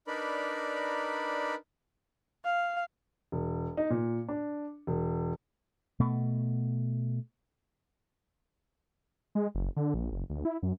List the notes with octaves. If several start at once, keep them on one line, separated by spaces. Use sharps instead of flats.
D4 D#4 A#4 B4 D5 B5
F5
E1
D#4
A#2
D4
E1
B2 A3
G#3
F#1
D3
A#1
F#1
D2
E4
F#2